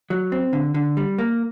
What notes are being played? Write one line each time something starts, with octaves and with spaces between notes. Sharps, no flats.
F#3
C4
D3
D3
G3
A#3